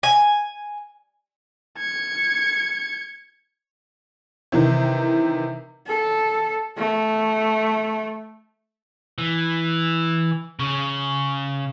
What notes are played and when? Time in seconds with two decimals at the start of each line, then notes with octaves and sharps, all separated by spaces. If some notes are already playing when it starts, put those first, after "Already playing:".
0.03 G#5
1.79 G#6 C#7
4.52 C3 D#3 E3
5.87 A4
6.78 A3
9.18 E3
10.59 C#3